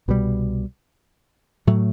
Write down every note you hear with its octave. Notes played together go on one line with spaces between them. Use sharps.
C2 B2 G3
A2 F#3 A3